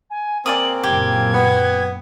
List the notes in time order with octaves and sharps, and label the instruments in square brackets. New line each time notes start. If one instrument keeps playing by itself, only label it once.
[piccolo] G#5
[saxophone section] C#3 A#3 C4 [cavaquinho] D5 G#5 D#6 [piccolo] F#7
[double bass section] F#1 A#2 [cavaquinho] G4 [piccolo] G#6
[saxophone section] B3